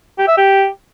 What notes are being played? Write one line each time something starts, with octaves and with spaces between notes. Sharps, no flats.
G4
E5
G4